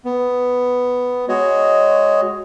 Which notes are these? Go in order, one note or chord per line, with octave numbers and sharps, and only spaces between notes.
B3
G#3 F#4 C#5 D#5